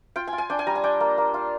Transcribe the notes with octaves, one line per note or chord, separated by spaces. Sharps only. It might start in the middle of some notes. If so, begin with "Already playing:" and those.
F4 G5
G#5
F4
G#5
D4 G5
G#5
G3 A#5
G#5
D4 G5
A#3
A#3
F4